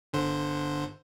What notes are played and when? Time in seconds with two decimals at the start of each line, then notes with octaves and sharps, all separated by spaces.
0.13 G1 D3 C5